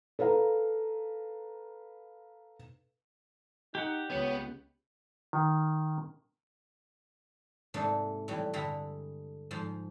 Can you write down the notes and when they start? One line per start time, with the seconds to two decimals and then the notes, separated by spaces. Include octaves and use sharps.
0.19 A4 B4 F5 A#5
3.75 D#4 G4 F#5
4.10 C#2 B3 C#5
5.33 D#3
7.74 G#2 C3 A3 A#3 D4
8.28 A2 E3 F#3 G3
8.53 G2 D3 G#3 E5 A#5 B5
9.51 G#2 F3 F4